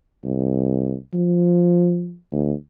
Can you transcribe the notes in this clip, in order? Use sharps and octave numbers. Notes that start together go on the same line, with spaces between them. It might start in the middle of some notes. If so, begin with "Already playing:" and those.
C2
F3
D2